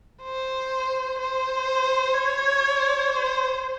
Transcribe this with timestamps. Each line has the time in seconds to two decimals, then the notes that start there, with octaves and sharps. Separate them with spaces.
0.23 C5
1.19 C5
2.14 C#5
3.10 C5